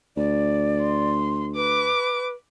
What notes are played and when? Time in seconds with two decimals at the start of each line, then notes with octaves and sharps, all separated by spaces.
0.17 D2 D5
0.82 C6
1.56 B4 D6